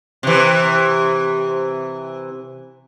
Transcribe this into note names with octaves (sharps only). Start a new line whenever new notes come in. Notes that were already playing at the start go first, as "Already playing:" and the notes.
C3 E3